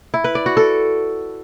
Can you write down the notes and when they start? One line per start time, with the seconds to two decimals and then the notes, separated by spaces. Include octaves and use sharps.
0.14 E4
0.24 B4
0.35 D5
0.46 F#4
0.57 A4